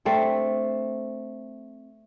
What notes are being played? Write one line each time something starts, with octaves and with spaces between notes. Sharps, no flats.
A3 C4 D4